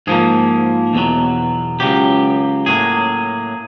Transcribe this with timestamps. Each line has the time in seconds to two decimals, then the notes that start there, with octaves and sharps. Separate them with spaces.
0.07 G#2 F3 A#3 G#4
0.94 E2 B2 F#3
1.80 C#2 C#3 F#3 G4
2.66 A2 F#3 A#3 G#4